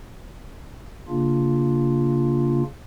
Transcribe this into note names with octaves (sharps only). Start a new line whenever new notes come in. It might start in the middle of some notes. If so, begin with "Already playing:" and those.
C#3 A#3 D4 F4